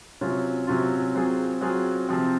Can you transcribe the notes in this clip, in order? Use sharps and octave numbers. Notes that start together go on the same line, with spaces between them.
C3 F#3 C#4 F4
C3 F#3 C#4 F4
F#3 C4 F4 G#4
F#3 C4 F4 G#4
C3 F3 C4